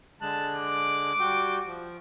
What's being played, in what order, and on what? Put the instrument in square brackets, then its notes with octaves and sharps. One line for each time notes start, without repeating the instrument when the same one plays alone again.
[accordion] D3 G#3 F#6 [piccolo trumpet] A5
[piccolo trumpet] D6
[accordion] G3 F#4 G5
F3